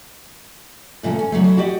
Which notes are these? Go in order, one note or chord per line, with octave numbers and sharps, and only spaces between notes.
G2 A#2 C#3 A3
C#4
C#3 F3 F#3 A3
F#3 E4
F#4 G4 D5 D#5